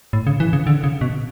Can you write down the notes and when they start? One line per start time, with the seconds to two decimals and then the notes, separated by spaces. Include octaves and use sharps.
0.13 A2
0.27 C#3
0.40 E3
0.53 C#3
0.67 D3
0.84 C#3
1.01 B2